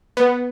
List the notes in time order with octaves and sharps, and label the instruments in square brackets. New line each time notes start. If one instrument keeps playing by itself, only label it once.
[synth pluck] B3